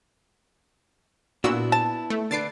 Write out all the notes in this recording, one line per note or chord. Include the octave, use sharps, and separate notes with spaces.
A#2 B3 D4 E4 F#4 E6
A5
A3
D3 D4 B4 A6 C7 D7